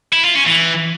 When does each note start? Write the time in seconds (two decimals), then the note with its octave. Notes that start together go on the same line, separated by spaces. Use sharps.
0.13 E4
0.24 F4
0.36 C#4
0.47 E3